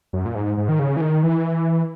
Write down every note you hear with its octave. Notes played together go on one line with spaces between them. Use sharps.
F#2
A#2
G#2
G#2
D#3
C#3
E3
D#3
E3